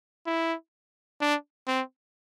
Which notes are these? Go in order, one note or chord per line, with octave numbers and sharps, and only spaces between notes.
E4
D4
C4